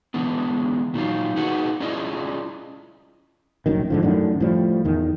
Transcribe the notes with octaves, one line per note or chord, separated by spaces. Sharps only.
D3 E3 G#3 B3
A#2 D#3 F#3 F4
D#4 F#4 G#4 B4 F#5
C#4 E4 F4 G#4 D5 D#5
F1 A#1 F#2 D#3
G#2 D3 F3
F#2 A2 D3 D#3
A2 F3 G3
E2 D#3